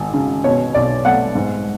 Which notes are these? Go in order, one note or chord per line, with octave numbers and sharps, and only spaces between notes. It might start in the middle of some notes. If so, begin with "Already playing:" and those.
Already playing: G#1
C#3
B2 C#5
B1 D5
A3 F#5
G#2